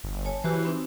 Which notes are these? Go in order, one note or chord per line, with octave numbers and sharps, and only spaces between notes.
G1
C#5 G#5 A5
E3 F#4 G4 C5
C4 D#4